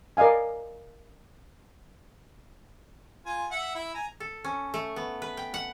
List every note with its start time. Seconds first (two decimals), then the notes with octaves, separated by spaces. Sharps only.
0.17 A#4 D5 D#5 F5 G#5
3.26 F4 G#5
3.51 E5 F#5
3.75 E4 E5
3.95 G#5 A#5
4.20 A4
4.44 C#4
4.74 A3
4.96 B3
5.22 B4
5.37 G5
5.54 F#5